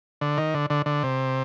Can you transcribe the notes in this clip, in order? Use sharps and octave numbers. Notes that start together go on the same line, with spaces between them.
D3
D#3
D3
D3
D3
C3